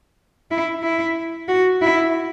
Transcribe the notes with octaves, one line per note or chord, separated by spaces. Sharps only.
E4
E4
F#4
E4